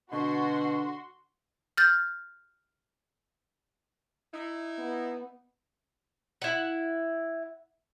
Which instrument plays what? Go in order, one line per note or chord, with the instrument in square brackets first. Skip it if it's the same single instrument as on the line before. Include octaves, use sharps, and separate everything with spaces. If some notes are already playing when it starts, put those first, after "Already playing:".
[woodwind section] B2 [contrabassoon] D3 [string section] F#4 C6
[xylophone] F6 G6 A6
[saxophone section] D#4 E4
[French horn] B3
[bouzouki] E4 F#5